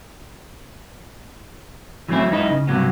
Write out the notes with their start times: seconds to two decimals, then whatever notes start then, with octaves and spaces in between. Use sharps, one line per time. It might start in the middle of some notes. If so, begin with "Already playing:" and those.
2.08 E3 F#3 A3 C4 C#4 E4
2.31 F#2 G#3 D#4 E4 B4 D#5
2.50 C#3
2.67 G2 C3 F#3 A#3 B3